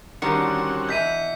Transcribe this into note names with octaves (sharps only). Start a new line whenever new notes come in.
D3 D#3 G3 C4 C#4 F#4 C#7
B2 E3 G6 B6 D#7